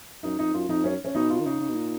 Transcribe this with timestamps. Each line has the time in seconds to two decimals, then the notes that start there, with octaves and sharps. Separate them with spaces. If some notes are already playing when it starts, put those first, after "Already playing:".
0.23 F#2 D#4
0.39 F2 D#4
0.54 F#2 F4
0.69 F2 D#4
0.84 F#2 C#4
1.05 C#4
1.15 B2 D#4
1.30 F4
1.40 D#3
1.45 C#3 D#4
1.60 C#3
1.69 B2
1.75 A#2